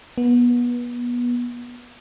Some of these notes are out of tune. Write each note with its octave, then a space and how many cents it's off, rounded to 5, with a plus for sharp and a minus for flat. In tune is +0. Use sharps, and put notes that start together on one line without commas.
B3 -25